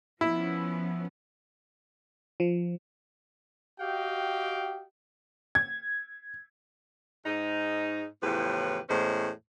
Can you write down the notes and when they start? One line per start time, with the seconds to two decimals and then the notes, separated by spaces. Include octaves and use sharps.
0.21 F3 B3 C#4 E4
2.40 F3
3.80 F#4 G4 D#5 F5 G5
5.55 G#6
7.26 G#2 D#4
8.22 E2 A2 C#3 F3 G4 B4
8.89 E2 A2 G#3 C#4 C5